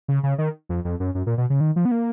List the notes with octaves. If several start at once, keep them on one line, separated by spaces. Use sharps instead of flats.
C#3
C#3
D#3
F2
F2
F#2
F#2
A#2
B2
C#3
D#3
F3
B3
A#3